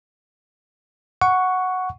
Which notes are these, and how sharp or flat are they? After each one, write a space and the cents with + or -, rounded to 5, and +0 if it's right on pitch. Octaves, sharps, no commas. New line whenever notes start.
F#5 -5 C#6 +5